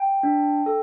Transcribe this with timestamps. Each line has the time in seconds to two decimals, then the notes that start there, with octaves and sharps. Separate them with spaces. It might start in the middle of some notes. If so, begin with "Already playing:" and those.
Already playing: G5
0.23 D4
0.66 A4